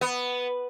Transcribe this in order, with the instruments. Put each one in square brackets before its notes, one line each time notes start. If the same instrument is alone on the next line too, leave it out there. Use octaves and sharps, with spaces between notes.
[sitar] B3